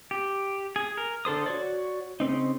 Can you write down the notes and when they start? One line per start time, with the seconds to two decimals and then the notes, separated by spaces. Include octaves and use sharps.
0.11 G4
0.76 G#4
0.97 A#4
1.25 D3 A4 C5 D#6
1.46 F#4 C#5 D5
2.20 C#3 A#3 C4 D#4